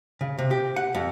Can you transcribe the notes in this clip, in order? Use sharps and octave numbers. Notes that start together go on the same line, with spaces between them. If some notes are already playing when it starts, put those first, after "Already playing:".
C#3
C3
G4
F#5
F2